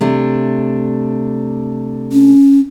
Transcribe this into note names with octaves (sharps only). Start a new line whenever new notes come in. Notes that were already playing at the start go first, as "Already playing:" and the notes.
C3 A3 D4
C#4